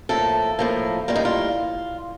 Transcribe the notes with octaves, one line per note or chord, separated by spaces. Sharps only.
A2 F3 A#3 A4
A2 F3 A#3
A2 G3 A#3 F4
D#4
F4